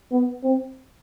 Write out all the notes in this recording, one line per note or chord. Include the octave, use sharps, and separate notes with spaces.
B3
C4